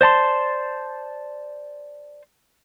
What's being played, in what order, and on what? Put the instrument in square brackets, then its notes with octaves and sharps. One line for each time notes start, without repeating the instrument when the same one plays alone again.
[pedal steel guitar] C5 D5 A5 C6